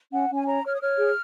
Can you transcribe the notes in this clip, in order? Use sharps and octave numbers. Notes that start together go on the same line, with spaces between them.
C#4 F#5
C#4
G#5
C#5 A#5
C#5 F6
D#6
C#5 F6
G#4